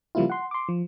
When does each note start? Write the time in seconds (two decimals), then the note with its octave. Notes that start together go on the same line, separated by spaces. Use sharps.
0.15 C#3 F3 G3 A#3 E4 F4
0.30 F#5 C6
0.51 C6 D6
0.69 F3